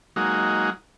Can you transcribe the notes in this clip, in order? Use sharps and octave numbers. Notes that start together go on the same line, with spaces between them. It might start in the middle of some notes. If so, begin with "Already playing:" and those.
F#3 G#3 A#3 D#4 F#4